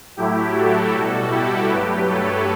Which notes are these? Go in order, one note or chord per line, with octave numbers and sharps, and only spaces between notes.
A2 F#3 A3 E4 G4
F#4 A4
B2 G3
E4 G4
G2 F#3 A3 G4 B4
A4 C#5